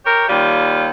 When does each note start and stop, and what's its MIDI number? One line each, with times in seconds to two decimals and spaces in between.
0.05 0.26 67
0.05 0.26 70
0.05 0.26 73
0.28 0.88 39
0.28 0.88 55
0.28 0.88 65